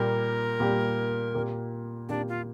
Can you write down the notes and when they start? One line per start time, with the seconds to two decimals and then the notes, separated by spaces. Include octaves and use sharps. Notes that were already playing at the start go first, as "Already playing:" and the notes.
Already playing: A#2 G3 A#3 G4 A#4
0.60 A#2 G3 A#3 G4
1.34 A#2 A#3 G4
2.09 A#2 A#3 D4 G4
2.28 F4